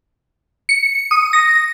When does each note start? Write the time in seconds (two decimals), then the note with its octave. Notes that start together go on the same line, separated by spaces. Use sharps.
0.69 C#7
1.11 D#6
1.33 A#6